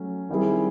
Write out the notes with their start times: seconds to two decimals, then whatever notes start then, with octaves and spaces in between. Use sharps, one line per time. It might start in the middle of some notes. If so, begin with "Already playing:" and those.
Already playing: F#3 A3 C#4
0.29 D#3 G3 C4 E4 G#4